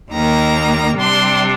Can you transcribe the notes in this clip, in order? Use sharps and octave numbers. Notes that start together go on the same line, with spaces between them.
D#2 D#3 A#3 A#5
C3 G3 D4 C6